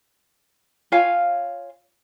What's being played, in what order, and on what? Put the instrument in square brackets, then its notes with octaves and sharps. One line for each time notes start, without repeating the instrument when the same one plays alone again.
[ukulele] F4 C#5 F5 G#5